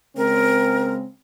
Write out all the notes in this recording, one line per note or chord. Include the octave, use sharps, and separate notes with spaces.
C#3 G#3 C4 A#4